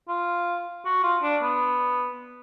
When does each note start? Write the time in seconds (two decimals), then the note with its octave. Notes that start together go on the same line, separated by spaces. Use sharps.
0.09 F4
0.85 F#4
1.03 F4
1.23 D4
1.42 B3